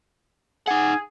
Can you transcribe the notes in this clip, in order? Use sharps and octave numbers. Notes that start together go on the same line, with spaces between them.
D#4 G#4 F#5